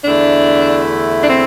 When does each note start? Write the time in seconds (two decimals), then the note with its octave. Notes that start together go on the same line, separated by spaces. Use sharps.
0.04 E2 D3 A3 D4 E4
1.23 D4
1.29 C4